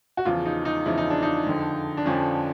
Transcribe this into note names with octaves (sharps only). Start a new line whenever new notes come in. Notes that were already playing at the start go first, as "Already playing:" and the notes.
F#4
E2 C#3 F3 F4
D#4
D#4
E2 C#3 F3 E4
D#4
D4
D#4
F2 D3 F3
D4
F2 D3 F3 C#4